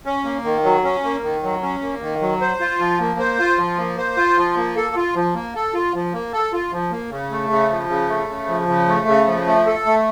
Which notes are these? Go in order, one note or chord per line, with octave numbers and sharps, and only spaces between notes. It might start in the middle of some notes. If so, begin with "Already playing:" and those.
C#4
A#3
D#3
F#3
C#4
A#3
D#3
F#3
C#4
A#3
D#3
F#3
C5
F4
F3
A#3
C5
F4
F3
A#3
C5
F4
F3
A#3
A4
F4
F3
A#3
A4
F4
F3
A#3
A4
F4
F3
A#3
C#3
A3
C#3
F3
C#3
A3
C#3
F3
C#3
A3
C#3
F3
A3
A4
A3